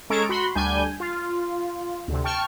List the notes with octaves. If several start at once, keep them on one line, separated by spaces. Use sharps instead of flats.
G#3 C#4 A4 A#5 C#6 D7
F#4 B5 C6
D2 G3 D4 G#5 G6
F4
D2 C3
G5 A5 C#6 F6